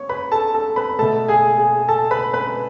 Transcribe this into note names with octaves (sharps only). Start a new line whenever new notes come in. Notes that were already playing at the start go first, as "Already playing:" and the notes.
Already playing: C#5 C#6
B4 B5
A4 A5
A4 A5
B4 B5
B2 A3 A4 A5
G#4 G#5
G#4 G#5
A4 A5
B4 B5
B4 B5